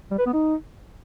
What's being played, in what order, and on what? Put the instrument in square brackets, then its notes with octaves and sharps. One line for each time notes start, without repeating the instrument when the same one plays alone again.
[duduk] G3
B4
B3
D#4